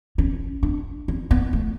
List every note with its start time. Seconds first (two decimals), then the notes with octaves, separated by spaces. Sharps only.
0.18 C#4
0.63 D4
1.08 C#4
1.31 B3
1.53 A3